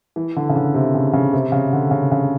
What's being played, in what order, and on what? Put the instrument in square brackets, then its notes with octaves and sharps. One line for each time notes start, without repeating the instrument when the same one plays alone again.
[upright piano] E3
D3
C#3
D3
C3
C#3
C#3
C3
C#3
D3
C#3
C#3